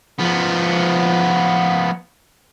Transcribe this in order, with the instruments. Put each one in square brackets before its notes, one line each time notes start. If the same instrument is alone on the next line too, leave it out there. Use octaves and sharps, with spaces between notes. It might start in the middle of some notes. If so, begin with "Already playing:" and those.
[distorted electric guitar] F3 B3